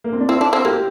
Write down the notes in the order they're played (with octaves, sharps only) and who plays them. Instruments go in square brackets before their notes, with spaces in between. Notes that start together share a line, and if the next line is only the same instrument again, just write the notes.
[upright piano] A#3
C4
D4
[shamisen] C4 [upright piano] E4
[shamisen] D4
C4
[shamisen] A#3 [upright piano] G4